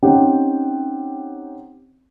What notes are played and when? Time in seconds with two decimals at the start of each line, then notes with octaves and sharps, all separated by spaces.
0.02 C4 C#4 D#4 G4 F#5 G5